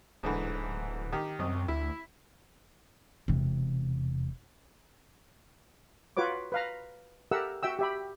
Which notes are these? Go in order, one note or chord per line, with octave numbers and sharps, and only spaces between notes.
D1 G#2 D3 E3
D#3 G4
C2 F#2 D#5
D2 E4
E1 C3
F4 F#4 B4 C#5 D6
B4 F5 A#5
G4 A4 A#4 E5 F#5 E6
F#4 E5 G5 E6
G4 E5 B5